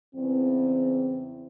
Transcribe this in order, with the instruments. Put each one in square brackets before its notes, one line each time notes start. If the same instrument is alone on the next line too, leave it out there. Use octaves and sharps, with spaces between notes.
[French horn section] E2 C#3 E3 C4